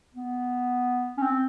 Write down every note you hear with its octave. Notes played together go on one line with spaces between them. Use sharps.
B3
C#4
C4